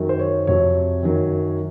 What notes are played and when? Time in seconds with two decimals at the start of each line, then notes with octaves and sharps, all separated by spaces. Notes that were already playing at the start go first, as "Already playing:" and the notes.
Already playing: F#2 D#3 F#3
0.09 C5
0.19 C#5
0.47 F2 C3 F#3 C#5
1.03 F#2 D#3 F#3